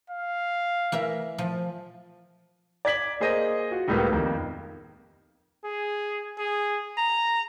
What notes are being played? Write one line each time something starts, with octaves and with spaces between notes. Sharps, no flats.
F5
E3 A#4 E5
F3
D5 G#6 B6 F#7
A#3 G#4 C5 D#5 D#7
F4 F#4
C#2 A2 G3 A#3 B3
F2 D#3 A#3
G#4
G#4
A#5